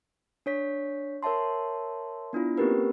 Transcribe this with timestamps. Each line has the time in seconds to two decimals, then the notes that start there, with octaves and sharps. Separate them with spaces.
0.46 D4 C#5 B6
1.23 A#4 C#5 E5 A5 C6
2.33 B3 D4 E4 F4
2.58 A#3 C4 C#4 G4 A#4 B4